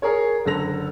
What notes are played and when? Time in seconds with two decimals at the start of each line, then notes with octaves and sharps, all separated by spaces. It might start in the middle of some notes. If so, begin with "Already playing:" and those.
0.02 G#4 A#4 C#5
0.45 F#1 D3 A4 A#6 F7